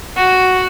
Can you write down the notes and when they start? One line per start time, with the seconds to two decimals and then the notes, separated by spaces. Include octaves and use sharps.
0.17 F#4